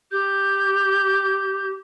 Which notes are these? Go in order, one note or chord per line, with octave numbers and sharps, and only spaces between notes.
G4 G6